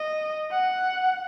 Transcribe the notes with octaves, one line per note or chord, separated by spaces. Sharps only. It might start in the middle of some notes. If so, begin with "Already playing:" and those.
Already playing: D#5
F#5